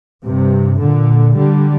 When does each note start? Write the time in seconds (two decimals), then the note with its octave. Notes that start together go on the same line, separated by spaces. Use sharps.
0.24 G2 C3
0.80 A#2 D3
1.37 D3 G3